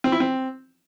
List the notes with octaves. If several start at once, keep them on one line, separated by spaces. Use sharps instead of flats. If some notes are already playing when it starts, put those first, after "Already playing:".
C4
E4
C4